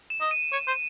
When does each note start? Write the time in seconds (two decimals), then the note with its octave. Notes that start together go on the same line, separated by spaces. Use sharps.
0.10 E7
0.21 D#5
0.31 D#7
0.52 C#5
0.68 C5